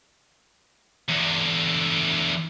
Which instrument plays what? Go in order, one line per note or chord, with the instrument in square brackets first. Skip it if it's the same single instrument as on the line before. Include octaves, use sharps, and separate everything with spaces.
[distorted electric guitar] E2 D3